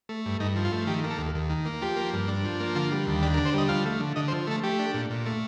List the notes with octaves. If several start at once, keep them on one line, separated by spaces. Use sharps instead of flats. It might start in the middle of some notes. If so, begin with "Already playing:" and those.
A3
G2
G2 D#4
F3
F4
A3
D#3 G4
A#3
A4
D#2
D#2
D#3
A#3
F3 G4
A#3
G2
D4
F3
A#3
D3 F4
G3
D#2
D4 G4
A#4
D3
C5
G3 D#5
F3 F5
A3
D3
D3 D#5
C5
F3
A3 A4
A3 G4
D4
A#2
A#2
A3